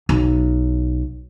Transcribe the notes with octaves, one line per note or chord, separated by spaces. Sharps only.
B1